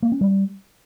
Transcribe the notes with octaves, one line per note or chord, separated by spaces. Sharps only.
A#3
C#4
G3